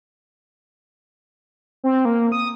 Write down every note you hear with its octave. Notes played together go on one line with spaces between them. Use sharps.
C4
A#3
D#6